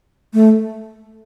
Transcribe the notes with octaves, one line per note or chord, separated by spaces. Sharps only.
A3